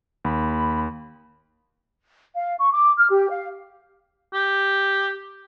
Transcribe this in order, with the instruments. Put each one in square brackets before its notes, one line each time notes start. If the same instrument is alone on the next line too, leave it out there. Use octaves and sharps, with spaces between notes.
[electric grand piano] D#2 [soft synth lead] B5
[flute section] F5
C#6
D6
F6
G4
F5
[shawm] G4